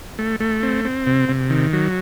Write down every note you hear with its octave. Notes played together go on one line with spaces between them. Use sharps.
A3
A3
C4
C4
C3
C3
D#3
F#3